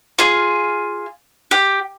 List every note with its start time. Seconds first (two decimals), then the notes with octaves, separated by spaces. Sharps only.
0.19 F4 G#4
1.51 G4